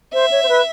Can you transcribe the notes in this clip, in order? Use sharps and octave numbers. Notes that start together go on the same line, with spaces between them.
C5 E5
C#5
C5
B4